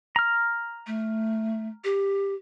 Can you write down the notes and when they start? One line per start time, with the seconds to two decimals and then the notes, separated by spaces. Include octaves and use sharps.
0.16 A#5 F6
0.87 A3
1.84 G4